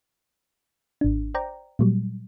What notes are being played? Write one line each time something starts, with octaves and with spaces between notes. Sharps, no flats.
G#1 D4
C5 D5 G5 A#5
A#2 F#3 G3